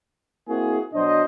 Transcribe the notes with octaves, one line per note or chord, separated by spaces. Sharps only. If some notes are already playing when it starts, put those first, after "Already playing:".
A#3 C4 E4 F#4 G#4
B2 F#3 D4 C5 D#5